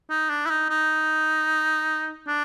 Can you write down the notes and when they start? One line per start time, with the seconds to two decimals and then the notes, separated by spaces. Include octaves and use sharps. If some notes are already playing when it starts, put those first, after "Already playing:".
0.10 D#4
0.30 D4
0.46 E4
0.50 D#4
0.69 D#4
2.27 D4